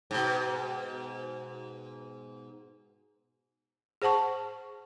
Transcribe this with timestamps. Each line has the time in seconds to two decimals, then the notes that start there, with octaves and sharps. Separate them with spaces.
0.11 G#2 B2
4.02 G#4 C5 F#5 A5 C#6